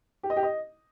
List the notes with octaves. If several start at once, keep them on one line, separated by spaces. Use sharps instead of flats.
G4
D#5
G4
D#5